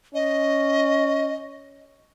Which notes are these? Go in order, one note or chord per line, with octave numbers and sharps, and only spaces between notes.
C#4 D#5